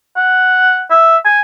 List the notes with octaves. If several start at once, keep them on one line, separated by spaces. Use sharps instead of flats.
F#5
E5
G#5